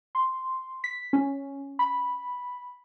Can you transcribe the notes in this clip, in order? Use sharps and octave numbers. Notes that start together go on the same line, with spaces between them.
C6
B6
C#4
B5